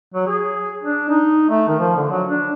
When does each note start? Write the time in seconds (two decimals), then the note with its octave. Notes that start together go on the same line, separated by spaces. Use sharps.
0.14 F#3
0.27 G#4
0.83 D4
1.09 D#4
1.50 A3
1.68 D#3
1.79 F3
1.96 D3
2.11 F#3
2.29 D4